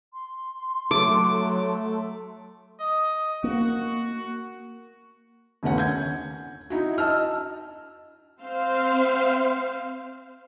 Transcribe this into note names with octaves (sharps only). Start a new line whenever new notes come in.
C6
F#3 A3 D6
D#5
A#3 F#4
G1 D#2 A3 C#4 F#5
G6 G#6
D#4 E4 F#4
D#5 A5 E6 F6
C4 C5 F5